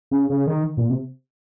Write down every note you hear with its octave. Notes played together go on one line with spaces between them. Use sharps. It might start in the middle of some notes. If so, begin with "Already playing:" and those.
C#3
C#3
D#3
A#2
C3